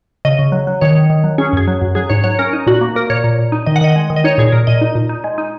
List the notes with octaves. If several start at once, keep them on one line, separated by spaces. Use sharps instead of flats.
C#3 D#5
C#3
F#3
F#3
D#3 C#5
D#3
D#3
F#3
C#4 G#4
F#2 G#4
F#3
F#2
F#3 G#4
G#2 C#5
F#3 C#5
C#4 A#4
D#4
A#2 F#4
A#3
A#3 A#4
A#2 C#5
A#2
A#2
D#4
D#3 D#5
F#5
D#3 D#5
G#3
D#3
D#5
D#4 C#5
A#2 G#4
A#2 A#4
A#2 D#5
D#4
A#2
D#4
G#3
D#4